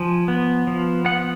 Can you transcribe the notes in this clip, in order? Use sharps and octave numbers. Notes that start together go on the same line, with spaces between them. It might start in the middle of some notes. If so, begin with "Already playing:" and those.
Already playing: F3 G#5
B3
F3
B3 F#5